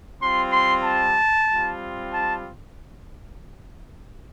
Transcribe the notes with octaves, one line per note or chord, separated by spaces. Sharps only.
G3 C4 F4 C6
C6
A5
G3 C4 F4
A5